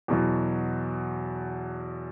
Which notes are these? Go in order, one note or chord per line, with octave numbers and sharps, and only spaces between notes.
E2 B2 F#3